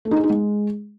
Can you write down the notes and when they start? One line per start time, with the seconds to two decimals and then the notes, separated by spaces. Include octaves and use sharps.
0.05 A3
0.11 D#4
0.17 G#4
0.23 D#4
0.30 G#3